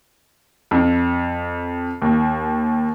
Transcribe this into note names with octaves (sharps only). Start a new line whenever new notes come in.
F2
D#2